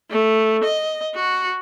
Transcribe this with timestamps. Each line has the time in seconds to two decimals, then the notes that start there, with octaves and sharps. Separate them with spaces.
0.11 A3
0.64 D#5
1.15 F#4